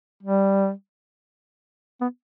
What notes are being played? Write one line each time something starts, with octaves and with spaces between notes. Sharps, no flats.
G3
B3